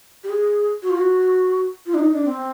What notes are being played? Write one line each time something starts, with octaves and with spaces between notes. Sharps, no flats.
G4
G#4
F#4
F4
F#4
F4
D4
D#4
D4
C4